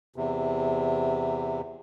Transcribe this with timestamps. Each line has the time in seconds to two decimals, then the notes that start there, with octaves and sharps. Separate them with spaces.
0.16 E2 C3